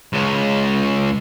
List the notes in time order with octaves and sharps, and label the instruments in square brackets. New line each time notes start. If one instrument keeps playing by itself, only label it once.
[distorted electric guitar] C#2 C#3